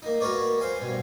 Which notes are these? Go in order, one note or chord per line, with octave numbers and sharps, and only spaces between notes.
A#3 D#4
F#4 A#4 B4 C#5 D5
C5 F5 G#5
G2 B2